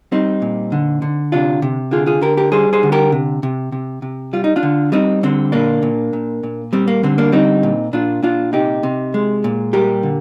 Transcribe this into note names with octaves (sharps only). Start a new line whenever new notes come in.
G3 C4 D#4
A#2
D3
D3
C3 D4 F4
C3
D3 F4 G#4
F4 G#4
D3 G4 A#4
G4 A#4
G3 G#4 C5
G#4 C5
D3
G4 A#4
C3
C3
C3
C3
G3 F4
D#4
D4 F4
D3
G3 C4 D#4
D3 C4
A#2 A#3 D4
A#2
A#2
A#2
G3 C4
A#3
D3 C4
A#3 D4
G3 C4 D#4
A#2
A#2 D4 F4
A#2 D4 F4
C3 D#4 G4
C3
G#3
A#2
G3 G4 A#4
D3